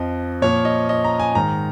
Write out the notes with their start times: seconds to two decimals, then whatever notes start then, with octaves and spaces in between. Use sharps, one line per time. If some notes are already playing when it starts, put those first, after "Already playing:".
Already playing: F2 F3 D#5
0.42 A#2 F3 C#5
0.65 D#5
0.89 D#5
1.04 A#5
1.20 G#5
1.35 G#2 D#3 A#5